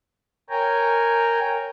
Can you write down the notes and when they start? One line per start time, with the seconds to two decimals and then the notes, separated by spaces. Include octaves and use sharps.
0.50 A#4 C#5 G5 G#5 A#5